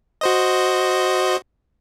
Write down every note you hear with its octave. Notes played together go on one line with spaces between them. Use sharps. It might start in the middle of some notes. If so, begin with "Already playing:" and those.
F#4 C5 D#5